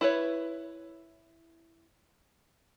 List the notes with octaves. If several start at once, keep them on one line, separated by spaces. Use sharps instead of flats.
E4 B4 C#5